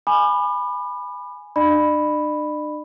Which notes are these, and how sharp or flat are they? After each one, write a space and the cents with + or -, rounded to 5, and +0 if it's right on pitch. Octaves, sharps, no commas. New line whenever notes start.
G#5 +0 B5 +0 D6 +40
D4 +40 D5 +45 B5 +0